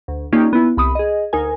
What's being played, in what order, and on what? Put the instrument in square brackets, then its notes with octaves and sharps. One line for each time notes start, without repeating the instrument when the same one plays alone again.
[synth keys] D2
A#3 C#4 D#4 F4 G4 D5
B3 E4
C2 B5 D#6
G#4 D#5
D2 D#4 A#4 G#5